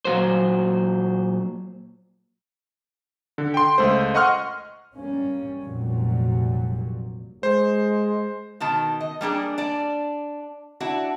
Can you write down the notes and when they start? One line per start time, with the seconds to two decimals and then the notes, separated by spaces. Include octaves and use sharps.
0.05 A#2 F#3 C5
3.38 D3
3.54 G5 C6
3.78 C#2 A3 C5
4.15 D#5 F#5 C6 C#6 F6
4.96 G3 A#3 C#4
5.63 F1 A#2 F#3 G3
7.43 G#3 C5
8.60 B2 D#3 A5
9.00 D#5
9.21 G3 A#3 D4 G#4
9.58 D4 D5
10.80 D4 E4 F#4